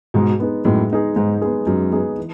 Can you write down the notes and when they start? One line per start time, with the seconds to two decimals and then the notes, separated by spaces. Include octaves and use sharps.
0.14 G#2 B2 G#3
0.40 B3 D#4 G#4
0.65 F#2 A2 G#3
0.91 B3 D#4 G#4
1.16 G#2 G#3
1.42 B3 D#4 G#4
1.67 F#2 G#3
1.92 B3 D#4 G#4
2.17 E3